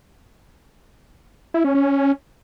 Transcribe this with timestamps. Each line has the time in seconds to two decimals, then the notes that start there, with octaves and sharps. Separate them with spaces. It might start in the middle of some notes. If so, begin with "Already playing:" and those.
1.54 E4
1.64 C#4
1.75 C#4